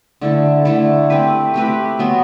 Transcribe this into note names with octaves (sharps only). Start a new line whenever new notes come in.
D3 A3 E4 A4
D3 A3 E4 A4
A3 C4 G4 B4
A3 C4 G4 B4
F#3 B3 F#4